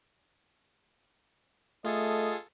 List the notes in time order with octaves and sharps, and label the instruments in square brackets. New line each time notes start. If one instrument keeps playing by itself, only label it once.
[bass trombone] A3 [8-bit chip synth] F4 G#4 A4 [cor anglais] D#5